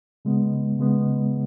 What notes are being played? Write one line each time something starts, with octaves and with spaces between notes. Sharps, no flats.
C#3 G#3 B3
C#3 G#3 B3